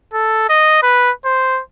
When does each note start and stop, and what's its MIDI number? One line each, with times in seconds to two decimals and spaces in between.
0.13 0.47 69
0.49 0.80 75
0.83 1.12 71
1.25 1.61 72